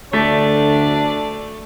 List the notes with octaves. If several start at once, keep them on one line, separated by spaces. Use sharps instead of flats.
D2 A3 D4 D5 A6 B6